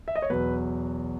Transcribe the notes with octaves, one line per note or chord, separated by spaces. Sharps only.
E5
D#5
C#5
E2 B2 F#3 B4